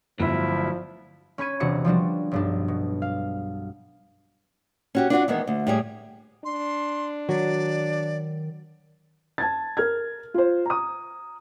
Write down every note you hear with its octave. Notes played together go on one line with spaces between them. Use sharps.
G1 D2 F3 F#3 E4
C#4 B5 C#6 G#6 D#7
E1 C3 D4 F#4 C#7
F3 G3 D4 F#4
B1 G2 D4
B2
F5
C#4 F#4 G4
D4 F4 F#4 F#5
D#3 E3 G#3 B3
D2
A2 G3 G#4
D4 C6
D#3 F#3 D5
A5 G#6 A6
A#4 F6 G#6
F4 C5
A#5 D#6